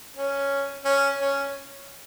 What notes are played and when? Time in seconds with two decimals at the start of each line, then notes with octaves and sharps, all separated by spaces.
0.17 C#4
0.85 C#4
1.20 C#4